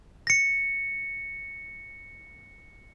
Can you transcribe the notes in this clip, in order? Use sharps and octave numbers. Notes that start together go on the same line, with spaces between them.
A#6 C#7